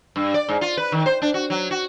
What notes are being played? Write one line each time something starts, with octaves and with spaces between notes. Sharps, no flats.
G2
D5
G#2
F4
B4
D#3
C5
D4
F#4
F#3
F#4